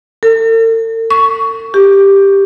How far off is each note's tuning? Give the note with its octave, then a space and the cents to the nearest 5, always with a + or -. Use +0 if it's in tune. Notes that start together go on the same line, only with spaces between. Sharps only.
A4 +45
C#6 +15
G4 +5